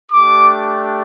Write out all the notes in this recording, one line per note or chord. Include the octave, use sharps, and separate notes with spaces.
A3 D4 G4 D6